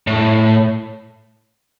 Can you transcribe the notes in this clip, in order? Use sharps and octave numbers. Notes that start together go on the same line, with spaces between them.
A2